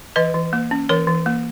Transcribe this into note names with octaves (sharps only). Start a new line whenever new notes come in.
E3 B4 D#5
E3
A#3
C#4
E3 A#4 C#5
E3
A#3